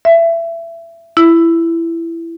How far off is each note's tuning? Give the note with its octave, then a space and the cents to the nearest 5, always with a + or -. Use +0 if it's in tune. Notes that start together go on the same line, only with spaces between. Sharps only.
E5 +25
E4 +15